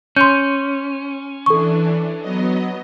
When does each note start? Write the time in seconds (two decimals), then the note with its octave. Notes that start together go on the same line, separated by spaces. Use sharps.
0.16 C#4 C6 G6
1.46 E3 D4 A4 C#6
2.21 F#3 B3 D#5